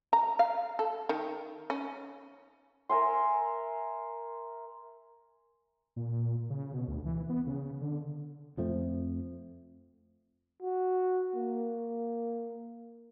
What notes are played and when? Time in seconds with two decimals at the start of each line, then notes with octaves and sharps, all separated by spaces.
0.13 A#5
0.39 F5
0.79 A4
1.09 D#3
1.70 C#4
2.89 A#4 E5 G#5 C6
5.96 A#2
6.50 C#3
6.74 B2
6.87 D2
7.05 E3
7.29 B3
7.47 C#3
7.81 D3
8.57 F2 F3 A3 C4
10.62 F#4
11.36 A#3